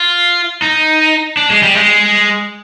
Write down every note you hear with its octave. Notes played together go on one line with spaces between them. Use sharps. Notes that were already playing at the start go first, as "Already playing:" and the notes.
Already playing: F4
D#4
D4
G#3
G3
G#3